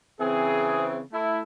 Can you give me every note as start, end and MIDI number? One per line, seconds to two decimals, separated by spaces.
0.21 1.01 49
0.21 1.01 52
0.21 1.01 60
0.21 0.86 68
1.13 1.41 57
1.13 1.41 64